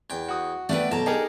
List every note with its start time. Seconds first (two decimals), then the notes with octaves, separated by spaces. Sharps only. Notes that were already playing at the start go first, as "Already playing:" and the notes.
0.10 E2 G5
0.28 F#4 D#6
0.69 A3 B3 D4 B4 D5 G5
0.92 B1 A4 A5 A#5
1.06 D#4 G4 G#4 A#4